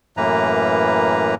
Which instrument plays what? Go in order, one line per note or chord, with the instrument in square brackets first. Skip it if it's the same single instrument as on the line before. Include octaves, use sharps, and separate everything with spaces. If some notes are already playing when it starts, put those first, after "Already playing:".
[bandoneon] F#2 A2 E3 A#3 B4 A#5